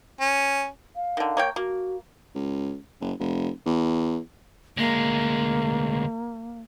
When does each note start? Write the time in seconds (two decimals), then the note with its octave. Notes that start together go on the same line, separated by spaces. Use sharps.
0.20 C#4
0.96 F5
1.17 D3 D#3
1.37 A#3 C#5 G5
1.56 A#3 F#4
2.35 C#2
3.01 F#1
3.19 F1
3.66 E2
4.77 D2 G#3 A#3